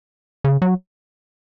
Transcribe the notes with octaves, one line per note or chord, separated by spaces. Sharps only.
C#3
F#3